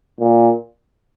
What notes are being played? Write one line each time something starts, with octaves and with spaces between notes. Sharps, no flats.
A#2